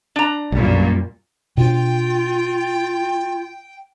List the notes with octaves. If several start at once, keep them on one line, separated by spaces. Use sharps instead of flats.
D4 A#5
B1 F#2 A#2 G3
B2 D4 F4 G5